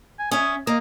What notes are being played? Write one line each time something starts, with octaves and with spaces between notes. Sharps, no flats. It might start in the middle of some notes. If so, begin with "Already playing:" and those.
G#5
C#4 E5 D#6
A#3 D#5